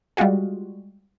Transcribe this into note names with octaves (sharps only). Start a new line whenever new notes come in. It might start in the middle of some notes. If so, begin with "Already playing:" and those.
G3 G#3 F4 F#4 G#4